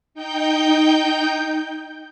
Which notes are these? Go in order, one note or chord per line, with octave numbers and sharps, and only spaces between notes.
D#4 G5 G6